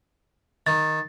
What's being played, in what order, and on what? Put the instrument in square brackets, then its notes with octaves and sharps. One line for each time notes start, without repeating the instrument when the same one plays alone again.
[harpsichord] D#3 [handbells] A6